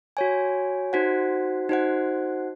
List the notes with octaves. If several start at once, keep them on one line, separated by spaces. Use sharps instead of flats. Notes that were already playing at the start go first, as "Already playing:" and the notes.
F#4 C#5 G#5
D#4 F#4 C5 F#5
D#4 F#4 C5 F#5